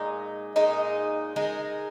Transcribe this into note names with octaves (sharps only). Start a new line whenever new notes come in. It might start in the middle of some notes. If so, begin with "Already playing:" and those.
Already playing: A#2 G#3 D#4
A#2 G#3 D#4
G#3 D#4 A#4